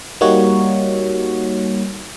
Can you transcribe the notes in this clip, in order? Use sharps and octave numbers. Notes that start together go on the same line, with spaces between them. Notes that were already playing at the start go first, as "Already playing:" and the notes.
G3 A#3 D#4 F#4 C#5